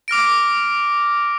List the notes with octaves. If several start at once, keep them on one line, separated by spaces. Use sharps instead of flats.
D6 F6 A#6 D7